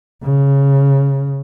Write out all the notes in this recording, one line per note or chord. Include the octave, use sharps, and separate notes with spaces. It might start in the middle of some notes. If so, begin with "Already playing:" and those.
C#3